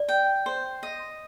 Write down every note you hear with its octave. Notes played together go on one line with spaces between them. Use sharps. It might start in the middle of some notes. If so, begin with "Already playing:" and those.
Already playing: D5
G5
C5
D#5